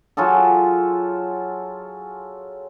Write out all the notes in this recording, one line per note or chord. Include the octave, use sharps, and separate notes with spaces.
F#3 F4 G#4 A4